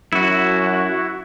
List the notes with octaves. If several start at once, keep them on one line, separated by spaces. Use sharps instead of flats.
F#2 E4 F#4